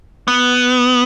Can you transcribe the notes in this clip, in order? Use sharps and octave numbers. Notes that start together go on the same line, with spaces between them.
B3